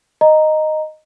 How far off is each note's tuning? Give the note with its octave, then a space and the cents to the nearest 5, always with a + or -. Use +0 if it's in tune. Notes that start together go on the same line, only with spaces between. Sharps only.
D#5 -5 A#5 +0